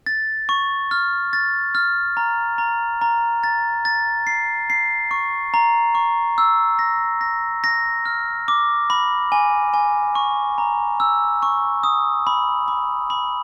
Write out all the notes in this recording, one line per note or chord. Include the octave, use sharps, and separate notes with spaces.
A6
C#6
F6
A6
F6
A#5
A#5
A#5
A6
A6
C7
C7
C#6
A#5
C#6
E6
A#6
A#6
A#6
F6
D6
B5
G#5
G#5
C#6
A#5
E6
C#6
D#6
B5
B5
B5